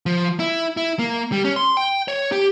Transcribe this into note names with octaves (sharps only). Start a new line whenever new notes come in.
F3
E4
E4
A#3
G3
C#4
C6
G5
C#5
G4